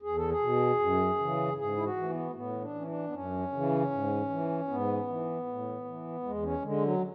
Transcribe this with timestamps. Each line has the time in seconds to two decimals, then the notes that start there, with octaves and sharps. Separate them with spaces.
0.02 E2 G#4
0.16 A4
0.30 G#4
0.41 B2
0.79 F#2
1.18 C#3 E3
1.57 G#2 G#4
1.77 E4
1.84 F#4
1.97 E3
2.03 A3
2.09 B3
2.30 A3
2.35 A2 B3
2.61 D4
2.74 E3 C#4
2.87 D4
3.07 B3
3.13 F#2 C#4
3.52 C#3 E3
3.91 G#2
4.30 E3
4.68 G#2 B3
5.07 E3
5.46 A2
5.85 E3
6.23 E2 G#3
6.43 C#4
6.63 D3 G#3
6.82 F#3